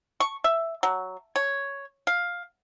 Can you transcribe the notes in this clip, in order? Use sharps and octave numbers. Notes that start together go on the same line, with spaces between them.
C#6
E5
F#3
C#5
F5